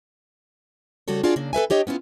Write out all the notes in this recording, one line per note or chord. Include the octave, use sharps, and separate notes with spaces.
C#3 G3 A3 F#4 A4 C#5
D4 F4 F#4 G#4 D5
C#3 A#3 D4
A4 B4 E5 G#5
D4 G4 C#5 D#5
B3 C#4 E4 F4